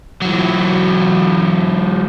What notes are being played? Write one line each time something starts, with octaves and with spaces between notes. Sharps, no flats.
E3 F#3